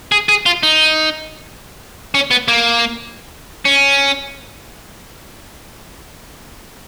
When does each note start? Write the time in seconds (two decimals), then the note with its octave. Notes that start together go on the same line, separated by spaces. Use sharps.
0.12 G#4
0.29 G#4
0.46 F4
0.63 D#4
2.15 C#4
2.31 B3
2.48 A#3
3.65 C#4